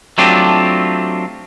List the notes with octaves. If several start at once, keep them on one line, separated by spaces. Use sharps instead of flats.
F#3 A3 C4 D4 F4 G4